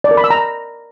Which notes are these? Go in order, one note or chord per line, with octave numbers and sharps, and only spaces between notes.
D5
A#4
B5
E6
A#5